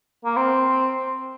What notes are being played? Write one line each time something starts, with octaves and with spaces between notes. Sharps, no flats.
A#3
C4